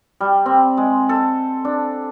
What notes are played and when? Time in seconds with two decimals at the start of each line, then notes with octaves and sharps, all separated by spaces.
0.20 G3
0.46 C4
0.77 G#3
1.09 A4
1.65 D4